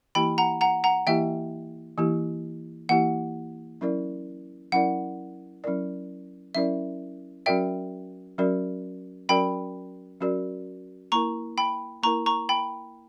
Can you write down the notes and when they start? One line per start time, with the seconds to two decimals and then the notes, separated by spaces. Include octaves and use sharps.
0.15 E3 A#3 E4 G4 G5 B5
0.38 F#5 A#5
0.61 F#5 A#5
0.84 F#5 A#5
1.07 E3 A#3 E4 G4 E5 G5
1.98 E3 A#3 E4 G4
2.89 E3 A#3 E4 G4 F#5
3.81 F#3 C#4 E4 A#4 D5
4.72 F#3 C#4 E4 A#4 D5 F#5
5.64 F#3 C#4 E4 A#4 D5
6.55 F#3 C#4 E4 A#4 D5 E5
7.46 F#3 C#4 F#4 A#4 D5 E5 G5
8.38 F#3 C#4 F#4 A#4 D5
9.29 F#3 C#4 F#4 A#4 D5 G5 B5
10.20 F#3 C#4 F#4 A#4 D5
11.12 A#3 E4 A#4 A#5 C#6
11.58 G5 B5
12.03 A#3 E4 A#4 A#5 C#6
12.26 A#5 C#6
12.49 G5 B5